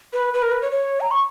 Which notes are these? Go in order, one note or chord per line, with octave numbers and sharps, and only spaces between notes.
B4
B4
A#4
B4
C#5
C#5
A#5
C#6